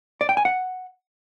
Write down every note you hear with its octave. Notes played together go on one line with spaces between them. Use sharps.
D5
G5
G#5
F#5